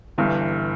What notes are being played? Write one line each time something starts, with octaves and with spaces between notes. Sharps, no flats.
G1 G2 E3